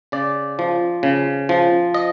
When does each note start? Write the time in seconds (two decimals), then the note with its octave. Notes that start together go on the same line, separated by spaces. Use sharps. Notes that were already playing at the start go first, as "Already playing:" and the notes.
0.12 C#3 D5
0.59 F3
1.03 C#3
1.49 F3
1.94 D#5